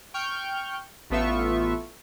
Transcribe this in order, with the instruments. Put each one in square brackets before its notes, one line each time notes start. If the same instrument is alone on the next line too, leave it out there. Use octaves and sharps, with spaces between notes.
[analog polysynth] G5 C#6 F6 G6
A1 A3 B3 F4 E5 C#6